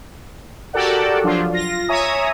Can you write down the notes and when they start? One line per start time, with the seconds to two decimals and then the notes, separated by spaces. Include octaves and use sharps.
0.73 F#4 G4 A4 A#4 D5 F#5
1.24 F3 F#3 D4 F4
1.52 F4 A#6
1.89 C#5 E5 G#5 A#5 D#6